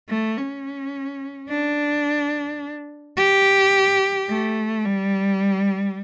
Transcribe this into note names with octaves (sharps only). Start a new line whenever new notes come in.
A3
C#4
D4
G4
A3
G3